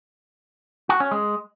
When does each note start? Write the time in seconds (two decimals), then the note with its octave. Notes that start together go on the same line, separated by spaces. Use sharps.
0.89 F#4
1.00 C#4
1.11 G#3